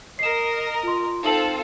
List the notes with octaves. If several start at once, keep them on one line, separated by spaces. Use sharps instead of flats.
A#4 D#5 C7 E7
F4 C6
C4 D#4 F4 A4 F#7